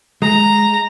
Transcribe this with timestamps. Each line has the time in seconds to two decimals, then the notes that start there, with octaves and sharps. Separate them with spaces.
0.22 G#3 A#5